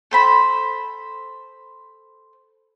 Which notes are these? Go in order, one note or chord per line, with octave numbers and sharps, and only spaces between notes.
A4 C5 B5